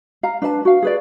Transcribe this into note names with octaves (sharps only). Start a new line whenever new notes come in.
F5 A#5
D4 B4 D#5 A5
F#4 F5
G#4 B4 D5